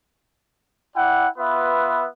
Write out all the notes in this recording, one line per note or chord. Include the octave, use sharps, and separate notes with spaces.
E4 D5 F#5 G5
B3 F4 B4 E5